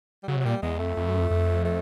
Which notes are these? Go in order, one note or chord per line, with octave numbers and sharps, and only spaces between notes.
G3
C#3 F#3
C3
F#3
A#2 G3
E2 G#3
F2 A3
F2
F#2
F2
F2
A3